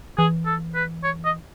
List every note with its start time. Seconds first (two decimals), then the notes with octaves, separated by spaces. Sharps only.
0.18 E3 G#4
0.46 A4
0.75 B4
1.04 C#5
1.25 D#5